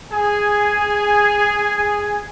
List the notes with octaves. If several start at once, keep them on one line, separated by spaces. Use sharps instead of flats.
G#4 G#5